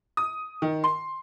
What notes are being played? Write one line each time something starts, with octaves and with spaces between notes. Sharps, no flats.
D#6
D#3
C6